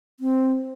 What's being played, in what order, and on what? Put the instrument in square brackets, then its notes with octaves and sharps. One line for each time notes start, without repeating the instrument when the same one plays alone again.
[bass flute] C4